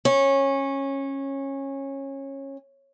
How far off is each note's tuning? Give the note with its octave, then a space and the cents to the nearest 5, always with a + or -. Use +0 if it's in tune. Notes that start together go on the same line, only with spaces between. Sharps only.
C#4 -20